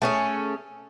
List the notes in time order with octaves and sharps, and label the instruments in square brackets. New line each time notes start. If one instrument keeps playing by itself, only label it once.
[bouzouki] A3 C#4 G#4